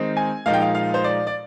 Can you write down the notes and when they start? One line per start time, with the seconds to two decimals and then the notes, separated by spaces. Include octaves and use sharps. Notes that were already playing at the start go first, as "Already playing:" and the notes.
Already playing: D#3 G#3 C4 D#4
0.17 G#5
0.46 A#2 F3 G#3 D#4 F5
0.53 G5
0.61 F5
0.75 F5
0.94 C5
1.04 D5
1.27 D5